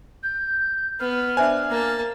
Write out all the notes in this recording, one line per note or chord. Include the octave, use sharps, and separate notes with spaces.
G6
B3 F6
D4 C5 E5 G#5
A#3 A5